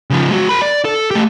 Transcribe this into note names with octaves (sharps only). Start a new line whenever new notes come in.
C#3 F3
G#3 F#4
A#4 B5
D5
A4
A3 G4